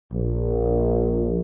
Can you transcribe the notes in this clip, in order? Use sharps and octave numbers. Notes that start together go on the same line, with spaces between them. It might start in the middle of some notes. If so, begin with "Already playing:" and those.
A#1